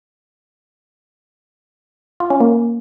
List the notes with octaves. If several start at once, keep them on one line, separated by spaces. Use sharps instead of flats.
F4
C#4
A#3